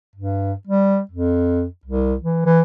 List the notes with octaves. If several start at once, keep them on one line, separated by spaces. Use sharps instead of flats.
G2
G3
F2
C2
E3
E3